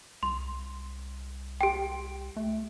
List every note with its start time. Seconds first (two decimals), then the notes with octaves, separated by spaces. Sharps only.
0.23 C2 C6
1.61 G4 G5
2.37 A3